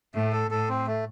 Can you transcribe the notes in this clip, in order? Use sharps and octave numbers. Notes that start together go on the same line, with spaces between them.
A2 A3
A4
A2 A4
C4
A3